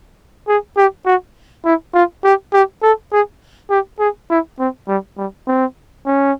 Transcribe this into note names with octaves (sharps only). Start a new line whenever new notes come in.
G#4
G4
F#4
E4
F4
G4
G4
A4
G#4
G4
G#4
E4
C4
G3
G3
C4
C#4